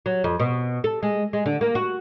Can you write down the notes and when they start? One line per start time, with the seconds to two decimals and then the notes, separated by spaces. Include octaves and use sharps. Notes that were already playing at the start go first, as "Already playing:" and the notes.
0.06 F#3
0.24 F2
0.40 B2
0.84 A4
1.03 G#3
1.33 G#3
1.46 D3
1.61 A#3
1.75 F#4